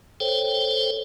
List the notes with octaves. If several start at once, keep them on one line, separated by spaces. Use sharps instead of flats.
A4 C5 C#5 G5